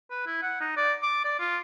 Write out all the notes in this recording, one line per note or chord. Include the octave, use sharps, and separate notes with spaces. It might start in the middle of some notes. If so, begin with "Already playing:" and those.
B4
E4
F#5
D#4
D5
D6
D5
F4